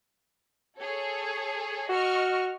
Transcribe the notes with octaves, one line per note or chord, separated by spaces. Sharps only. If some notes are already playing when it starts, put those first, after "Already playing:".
G#4 A4 C#5
F#4 D#5 C#6 F6